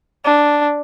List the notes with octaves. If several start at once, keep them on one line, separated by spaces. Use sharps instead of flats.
D4